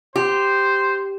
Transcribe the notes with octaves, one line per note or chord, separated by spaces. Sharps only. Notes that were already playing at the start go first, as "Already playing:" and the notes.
G4 C5